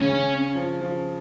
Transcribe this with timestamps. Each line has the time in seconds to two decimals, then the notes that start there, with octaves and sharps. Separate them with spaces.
0.02 C#3 C#4
0.55 F3
0.81 F3